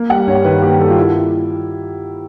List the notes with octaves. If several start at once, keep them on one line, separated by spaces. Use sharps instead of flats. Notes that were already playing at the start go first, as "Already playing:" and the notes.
Already playing: A#3
G3 F#5
G2 C#5
D#3 B4
A#3 G4
G3 A4
F4
E4